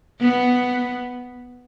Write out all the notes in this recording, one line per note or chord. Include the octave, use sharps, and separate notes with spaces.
B3